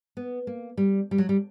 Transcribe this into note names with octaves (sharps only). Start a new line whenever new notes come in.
B3
A#3
G3
G3
F#3
G3